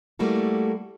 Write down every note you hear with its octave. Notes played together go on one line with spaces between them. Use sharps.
G3 A3 A#3 E4 F#4 A4